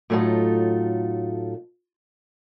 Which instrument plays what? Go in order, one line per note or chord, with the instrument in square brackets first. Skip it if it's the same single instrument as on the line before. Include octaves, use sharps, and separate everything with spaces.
[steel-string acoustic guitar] A2 F#3 A3 D#4 F4 A4